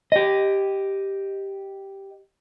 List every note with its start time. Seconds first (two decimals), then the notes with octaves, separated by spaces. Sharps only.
0.12 G4 D#5